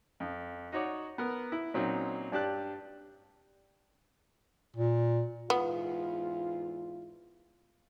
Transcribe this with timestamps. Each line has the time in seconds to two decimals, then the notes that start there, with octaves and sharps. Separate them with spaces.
0.20 F2
0.72 D#4 F#4 C#5 D5
1.18 B3 A#4
1.52 E4
1.74 A#2 F#3 C4 C#4 D#4
2.32 G2 D4 G4 A5 F#6
4.76 A#2
5.50 E2 G#2 B3 F4